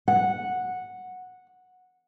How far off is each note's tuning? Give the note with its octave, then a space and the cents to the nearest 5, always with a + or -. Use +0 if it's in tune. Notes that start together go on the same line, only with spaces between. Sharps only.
F#5 -10